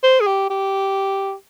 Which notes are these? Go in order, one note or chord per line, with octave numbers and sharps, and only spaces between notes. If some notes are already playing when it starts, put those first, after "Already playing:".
C5
G#4
G4
G4